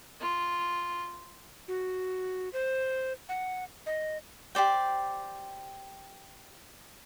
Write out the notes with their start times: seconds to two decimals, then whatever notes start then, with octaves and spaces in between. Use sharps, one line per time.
0.21 F4
1.68 F#4
2.53 C5
3.29 F#5
3.86 D#5
4.55 G4 C5 D5 G5